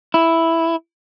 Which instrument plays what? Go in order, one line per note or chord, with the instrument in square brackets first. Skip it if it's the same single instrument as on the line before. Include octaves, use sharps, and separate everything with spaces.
[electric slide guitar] E4